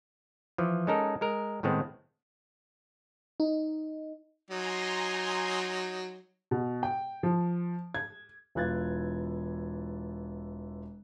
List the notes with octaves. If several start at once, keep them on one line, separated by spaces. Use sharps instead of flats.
E3 F3
G#3 C#4 D#4 A4 A#4
G#3 A#4
A2 D#3 G#3 B3 C4
D#4
F#3 D#4 G#5 A#5 C6
B2
G5
F3
G#6
E1 E3 F4 F#6 G#6 A6